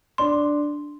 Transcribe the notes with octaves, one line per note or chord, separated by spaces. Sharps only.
D4 C6